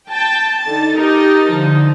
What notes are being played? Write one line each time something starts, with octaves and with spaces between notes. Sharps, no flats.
G5 A5
D3 D#4 A6
D#4 G4 A#4 A6
D3 F3